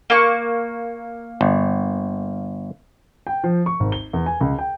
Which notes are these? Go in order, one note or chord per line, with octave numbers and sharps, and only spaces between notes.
A#3 C#6
G1
G5
F3
C#6
G#1
G7
E2
G#5
C#2
G5